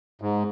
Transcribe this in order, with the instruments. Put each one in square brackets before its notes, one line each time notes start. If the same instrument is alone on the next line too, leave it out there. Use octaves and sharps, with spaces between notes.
[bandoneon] G#2